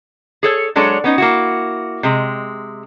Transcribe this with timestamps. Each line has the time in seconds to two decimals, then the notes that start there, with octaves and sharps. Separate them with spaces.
0.43 G#4 A4 C#5
0.75 F#3 G#3 D4 A4 C#5
1.04 B3 C#4 D#4
1.18 A#3 E4 F#4
2.03 C3 G#3